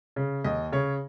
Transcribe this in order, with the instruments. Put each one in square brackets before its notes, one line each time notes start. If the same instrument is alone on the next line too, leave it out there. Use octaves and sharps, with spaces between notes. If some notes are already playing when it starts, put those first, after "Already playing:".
[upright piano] C#3
D#2 D#5
C#3 C#5